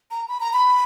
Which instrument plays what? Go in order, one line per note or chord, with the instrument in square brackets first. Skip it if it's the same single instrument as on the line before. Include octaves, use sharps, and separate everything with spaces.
[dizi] A#5
B5
A#5
B5